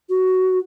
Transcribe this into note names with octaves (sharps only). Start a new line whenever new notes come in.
F#4